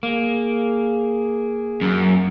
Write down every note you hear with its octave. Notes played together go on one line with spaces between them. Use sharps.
A#3 G#4
F#2